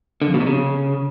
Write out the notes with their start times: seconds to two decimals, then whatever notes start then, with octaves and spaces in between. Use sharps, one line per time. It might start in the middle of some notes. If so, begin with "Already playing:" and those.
0.22 D3
0.28 F2
0.34 B2
0.40 C3
0.47 C#3